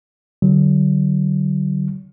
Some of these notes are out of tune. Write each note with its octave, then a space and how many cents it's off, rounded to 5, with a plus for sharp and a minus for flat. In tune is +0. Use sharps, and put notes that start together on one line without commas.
D3 +0 F#3 +30